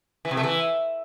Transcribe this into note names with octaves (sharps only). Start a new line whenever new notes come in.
E3
C3
A3
E3